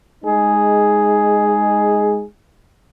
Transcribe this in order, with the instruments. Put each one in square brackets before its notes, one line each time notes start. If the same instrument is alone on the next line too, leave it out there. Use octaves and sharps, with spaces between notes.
[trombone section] G#3 D#4 G#4